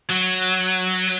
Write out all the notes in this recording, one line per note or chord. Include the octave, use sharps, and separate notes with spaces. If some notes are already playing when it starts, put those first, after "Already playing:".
F#3